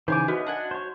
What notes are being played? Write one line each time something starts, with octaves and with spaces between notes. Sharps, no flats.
C#3 E3 D#4 C5 G#5 D6
B3 F#4 D#5
D4 F#5 G#5
C5 C#5